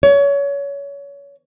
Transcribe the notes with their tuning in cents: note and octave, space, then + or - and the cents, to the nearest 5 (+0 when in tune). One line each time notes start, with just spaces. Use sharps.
C#5 +25